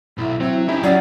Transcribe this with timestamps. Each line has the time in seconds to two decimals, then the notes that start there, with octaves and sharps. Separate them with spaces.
0.18 B1 E4
0.40 F#3 C4 E4
0.68 C#4 D#4 E4 G4 G#4
0.84 F#3 C#4 D5 F#5